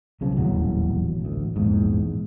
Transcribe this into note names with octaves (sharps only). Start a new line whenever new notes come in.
B1 C#3 F3
D#1 A1 E2 F#3
A1 D2
A#1 E2 G#2